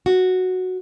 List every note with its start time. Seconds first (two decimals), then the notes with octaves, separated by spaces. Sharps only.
0.06 F#4